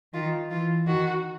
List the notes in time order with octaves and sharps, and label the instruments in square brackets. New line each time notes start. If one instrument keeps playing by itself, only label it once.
[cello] D#3 [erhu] F4
[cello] E3 [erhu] F4
[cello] D#3 [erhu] F#4